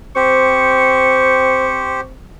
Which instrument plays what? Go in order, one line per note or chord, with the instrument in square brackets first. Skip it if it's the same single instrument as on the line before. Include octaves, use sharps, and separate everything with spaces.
[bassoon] C4 [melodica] G4 C5 [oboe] C#6